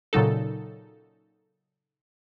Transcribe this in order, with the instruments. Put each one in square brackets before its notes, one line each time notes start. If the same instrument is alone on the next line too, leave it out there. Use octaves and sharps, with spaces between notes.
[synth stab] A#2 C#3 F#3 D#4 A4